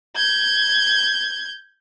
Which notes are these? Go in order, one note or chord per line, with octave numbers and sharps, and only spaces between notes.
G6 G#6